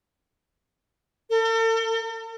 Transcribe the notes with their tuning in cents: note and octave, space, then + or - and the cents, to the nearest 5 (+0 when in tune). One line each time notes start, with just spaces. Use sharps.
A4 +45